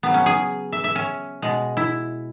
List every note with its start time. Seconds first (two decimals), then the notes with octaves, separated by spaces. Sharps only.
0.03 C#3 F#3 B3
0.14 C#4
0.26 G#4
0.73 E5
0.84 E5
0.96 C#4
1.42 B2 G#3
1.77 E4